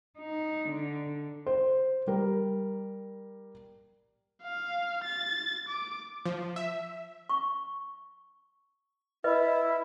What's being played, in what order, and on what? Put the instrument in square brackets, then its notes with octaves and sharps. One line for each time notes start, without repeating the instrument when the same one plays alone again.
[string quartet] D#4
D3
[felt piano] C5
G3 A#4
[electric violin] F5
A6
D6
[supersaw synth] F3
E5
[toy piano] C#6
[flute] E4 [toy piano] B4 D#5